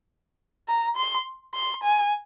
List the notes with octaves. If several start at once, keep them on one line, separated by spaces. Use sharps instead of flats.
A#5
C6
C6
G#5